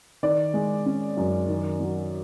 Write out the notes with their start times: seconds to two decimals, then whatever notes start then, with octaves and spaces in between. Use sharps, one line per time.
0.23 D#3 D5
0.54 G#3
0.86 C#4
1.17 F#2
1.48 D#3
1.80 F#3